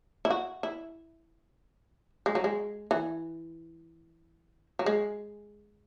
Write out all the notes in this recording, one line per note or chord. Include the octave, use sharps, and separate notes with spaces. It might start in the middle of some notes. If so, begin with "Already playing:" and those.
E4
F#4
E4
G#3
F#3
G#3
E3
F#3
G#3